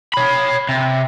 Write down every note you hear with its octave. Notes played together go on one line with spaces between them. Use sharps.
C#5 B5
C3